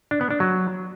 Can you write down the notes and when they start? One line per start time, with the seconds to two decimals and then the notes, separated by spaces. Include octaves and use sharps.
0.11 D4
0.21 B3
0.31 D4
0.40 F#3